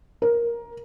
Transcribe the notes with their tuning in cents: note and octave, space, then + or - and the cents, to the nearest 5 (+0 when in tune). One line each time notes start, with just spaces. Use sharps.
A#4 +15